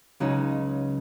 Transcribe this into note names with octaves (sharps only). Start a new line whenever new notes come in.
C#2 C#3 F#3 D#4